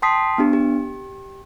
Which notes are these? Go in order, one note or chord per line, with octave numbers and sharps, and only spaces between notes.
G5 A5 C6 D#6 B6 C7
B3 D4 G4
G4